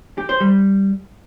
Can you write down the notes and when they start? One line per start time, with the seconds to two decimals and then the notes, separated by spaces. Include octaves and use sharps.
0.18 G4
0.29 C5
0.40 G3